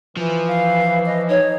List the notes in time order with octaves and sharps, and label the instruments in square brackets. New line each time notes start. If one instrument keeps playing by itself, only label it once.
[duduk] E3 [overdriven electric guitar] F3
[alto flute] F5
D#5
[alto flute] D#4 [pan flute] C#5